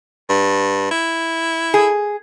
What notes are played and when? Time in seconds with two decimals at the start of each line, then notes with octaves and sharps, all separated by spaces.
0.29 G2
0.91 E4
1.74 G#4